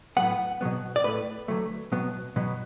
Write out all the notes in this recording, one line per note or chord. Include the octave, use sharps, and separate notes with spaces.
A2 F#3 B3 F#5
B2 F#3 B3
D5
A2 A3 B4
D3 F#3 A3
B2 F#3 B3
B2 F#3 B3